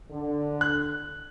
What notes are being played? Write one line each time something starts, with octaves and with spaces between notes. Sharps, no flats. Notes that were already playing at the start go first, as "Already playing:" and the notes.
D3
F#6